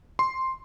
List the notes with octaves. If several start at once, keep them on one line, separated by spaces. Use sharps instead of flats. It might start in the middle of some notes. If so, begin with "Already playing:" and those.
C6